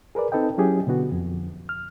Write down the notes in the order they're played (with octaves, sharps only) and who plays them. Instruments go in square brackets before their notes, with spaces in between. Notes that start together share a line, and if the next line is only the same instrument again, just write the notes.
[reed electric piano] G#4 A#4 B4 D5
C4 D#4 A4 B4 D#5 G5
F#3 C#4 E4 G4 G#4
B2 D3 B3 F#4
F2
F6